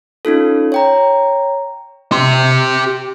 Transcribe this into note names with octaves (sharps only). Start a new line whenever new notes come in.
C#4 D#4 F4 A4
C#5 G5 A#5
G4 C6